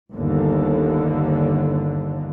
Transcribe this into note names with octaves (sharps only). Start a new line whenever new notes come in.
G1 D#2 D3